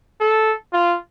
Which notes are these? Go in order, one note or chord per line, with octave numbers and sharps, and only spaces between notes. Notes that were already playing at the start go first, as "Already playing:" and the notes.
A4
F4